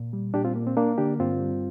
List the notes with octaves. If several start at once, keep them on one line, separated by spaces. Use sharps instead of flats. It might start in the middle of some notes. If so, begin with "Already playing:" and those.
Already playing: A#2
G3
A#2 D4 G4
C4 F4
A#3
C4
A#3 D4
D3 D4 G4
G2 C4 F4
G3